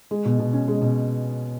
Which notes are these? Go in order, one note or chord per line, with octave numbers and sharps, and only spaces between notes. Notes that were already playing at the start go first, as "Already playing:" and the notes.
G#3
B2
B2
C#4
G#3
B2